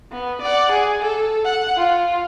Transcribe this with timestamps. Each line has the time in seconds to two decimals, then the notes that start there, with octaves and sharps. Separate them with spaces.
0.12 B3
0.42 D5 F#5
0.72 G#4
1.02 A4
1.45 F#5
1.77 F4